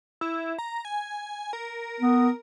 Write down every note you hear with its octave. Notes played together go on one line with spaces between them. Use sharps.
E4
A#5
G#5
A#4
B3